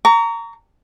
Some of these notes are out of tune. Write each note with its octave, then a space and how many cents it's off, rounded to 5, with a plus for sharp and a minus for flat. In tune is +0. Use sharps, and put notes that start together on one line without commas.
A#5 -15 C#6 +35